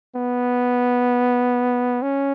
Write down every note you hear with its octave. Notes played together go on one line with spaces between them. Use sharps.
B3
C#4